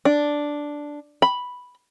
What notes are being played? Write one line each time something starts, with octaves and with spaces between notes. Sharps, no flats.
D4
B5